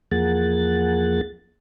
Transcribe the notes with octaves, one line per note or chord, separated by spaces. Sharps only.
E2 F3 A#3 G#4 F#5 A6